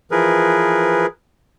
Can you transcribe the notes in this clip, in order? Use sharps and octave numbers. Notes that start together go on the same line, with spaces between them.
E3 F3 G#4 A#4 B4